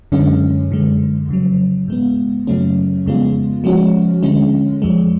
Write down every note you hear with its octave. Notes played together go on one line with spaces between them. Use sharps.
F#2 D3 G#3 C#4
F#2 D3 G#3
F2 C#3 F#3
G#2 G#3 B3
F#2 C#3 F#3 A3 C#4
F2 C#3 G#3 B3 F4
F3 G#3 C#4 F#4
D3 G#3 C#4
F2 F3 G#3